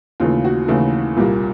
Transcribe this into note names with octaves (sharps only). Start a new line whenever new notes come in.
D#2 C#3 E3 A3 F4
F#4
D#2 C#3 E3 A3
C2 A#2 G3 A#3